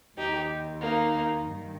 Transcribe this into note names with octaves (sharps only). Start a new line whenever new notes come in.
D#2 D#3 D#4 G4
A#3 D#4
G2 D#3